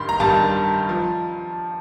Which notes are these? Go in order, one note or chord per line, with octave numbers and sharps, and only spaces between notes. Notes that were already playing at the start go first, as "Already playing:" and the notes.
Already playing: G2 D#3 G3 B5 C6
A#5
G2 D#3 G3 A5
F3